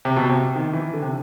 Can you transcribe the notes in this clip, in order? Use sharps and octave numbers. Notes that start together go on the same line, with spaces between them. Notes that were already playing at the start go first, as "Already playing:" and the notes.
C3
B2
C3
D#3
E3
D3
C3